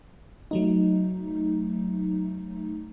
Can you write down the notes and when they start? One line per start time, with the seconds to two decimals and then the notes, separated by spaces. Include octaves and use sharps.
0.51 F#3 A3 D#4